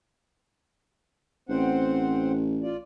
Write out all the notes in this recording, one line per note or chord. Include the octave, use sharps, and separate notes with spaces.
A1 C4 C5 F#5
F4 D5